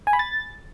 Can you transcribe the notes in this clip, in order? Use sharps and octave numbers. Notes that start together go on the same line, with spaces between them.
G#5
B5
A6